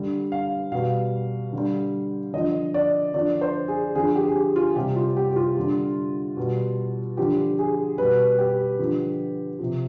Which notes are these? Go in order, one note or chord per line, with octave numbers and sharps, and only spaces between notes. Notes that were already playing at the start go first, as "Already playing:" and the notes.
Already playing: D3 G3
F5
B2 G3 F5
D3
G3
D3 F3 D#5
D5
D3 F3 D5
C5
G#4
D3 F3 G#4
G4
G#4
G4
F4
C3 G3 G4
F4
G4
G4
F4
D3 G3
B2 G3
D3 F3 G4
G#4
B2 G3 B4
G4
D3 F3
C3 F3